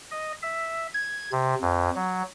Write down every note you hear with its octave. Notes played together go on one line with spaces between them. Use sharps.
D#5
E5
G#6
C3
F2
F#3